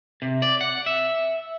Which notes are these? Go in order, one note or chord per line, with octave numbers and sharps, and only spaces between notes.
C3
D5
F#5
E5